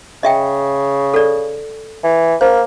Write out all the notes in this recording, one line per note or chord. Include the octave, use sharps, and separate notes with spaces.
C#3 D#5 E5 G5
A4 D5
E3
A#3 C5